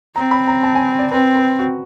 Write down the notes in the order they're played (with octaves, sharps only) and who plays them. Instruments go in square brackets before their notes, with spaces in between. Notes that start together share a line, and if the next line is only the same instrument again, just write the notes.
[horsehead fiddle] C4 [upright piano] A#5
[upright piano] B5
A#5
A5
G#5
D5
[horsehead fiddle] C4 [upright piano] B4
[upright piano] B4
F#4